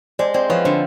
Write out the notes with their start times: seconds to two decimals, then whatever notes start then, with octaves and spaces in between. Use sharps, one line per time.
0.19 G#3 C5 D5
0.34 C4 C5 D5
0.50 F3 B4 C#5
0.65 D3 C5